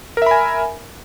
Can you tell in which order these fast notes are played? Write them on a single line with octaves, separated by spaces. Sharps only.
A#4 E5 B5 G#5